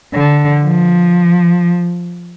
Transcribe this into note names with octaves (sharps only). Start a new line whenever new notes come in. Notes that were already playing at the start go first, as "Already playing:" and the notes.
D3
F3